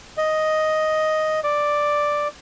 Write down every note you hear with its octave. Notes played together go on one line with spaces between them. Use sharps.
D#5
D5